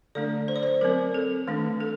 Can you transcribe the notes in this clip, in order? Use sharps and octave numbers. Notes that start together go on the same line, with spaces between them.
D3 A3 D4 D5
C5
D5
C5
F#3 C4 A#4
A4
D#3 A3 D4
A4